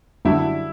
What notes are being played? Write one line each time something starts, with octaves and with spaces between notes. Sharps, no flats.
F#2 D3 G3 D4 E4 F#4